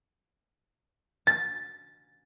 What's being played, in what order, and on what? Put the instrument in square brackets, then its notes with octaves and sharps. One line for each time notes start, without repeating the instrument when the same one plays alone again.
[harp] A6